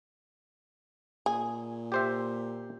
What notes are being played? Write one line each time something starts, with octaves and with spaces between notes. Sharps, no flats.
A#2 G#4
G4 C5 E5